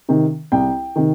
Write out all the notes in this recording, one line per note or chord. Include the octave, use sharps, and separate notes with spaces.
C3 D#3
C2 G5
C3 D#3